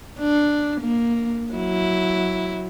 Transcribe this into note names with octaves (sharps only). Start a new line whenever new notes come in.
D4
A#3
F#3 E4